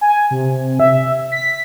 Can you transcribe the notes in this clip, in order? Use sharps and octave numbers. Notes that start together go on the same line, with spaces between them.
G#5
C3
E5
B6